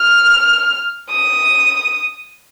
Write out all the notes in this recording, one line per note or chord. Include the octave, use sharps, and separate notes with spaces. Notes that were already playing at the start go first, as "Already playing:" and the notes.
Already playing: F6
D#6